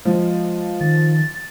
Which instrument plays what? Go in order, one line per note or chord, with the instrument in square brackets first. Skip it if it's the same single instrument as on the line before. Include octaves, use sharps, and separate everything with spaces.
[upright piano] F3 [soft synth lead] G#3
[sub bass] D#3 [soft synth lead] A6